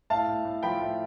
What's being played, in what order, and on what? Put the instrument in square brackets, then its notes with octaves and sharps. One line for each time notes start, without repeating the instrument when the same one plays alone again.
[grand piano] A2 F5 A5
A2
A2
F3 G5 B5
A2